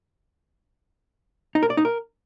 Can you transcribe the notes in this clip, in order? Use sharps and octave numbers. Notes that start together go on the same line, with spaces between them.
D#4
A#4
D5
D#4
A#4